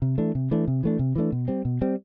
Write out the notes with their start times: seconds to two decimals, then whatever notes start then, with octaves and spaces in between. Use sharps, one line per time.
0.02 C3
0.18 E3 A3 D4
0.35 C3
0.51 E3 A3 D4
0.68 C3
0.83 E3 A3 D4
0.99 C3
1.16 E3 A3 D4
1.32 B2
1.48 G3 C4
1.65 B2
1.81 G3 C4